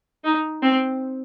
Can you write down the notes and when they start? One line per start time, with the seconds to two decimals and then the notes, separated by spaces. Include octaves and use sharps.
0.24 D#4
0.62 C4